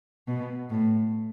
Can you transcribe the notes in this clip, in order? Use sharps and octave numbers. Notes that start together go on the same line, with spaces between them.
B2
A2